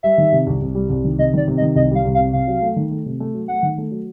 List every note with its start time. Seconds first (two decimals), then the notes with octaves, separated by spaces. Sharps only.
0.03 G3 E5
0.18 D#3
0.33 C3
0.47 C2
0.62 C2
0.75 G3
0.90 C2
1.04 D#3
1.19 C3 D#5
1.34 D#3 D5
1.48 C3
1.58 D#5
1.61 D#3
1.76 C2 D#5
1.91 G3 F5
2.05 C2
2.15 F5
2.19 C3
2.33 C3 F5
2.47 F#3
2.62 A3
2.76 D#3
2.91 A3
3.06 C3
3.20 A3
3.34 F#3
3.48 A3 F#5
3.63 D#3
3.78 A3
3.91 F#3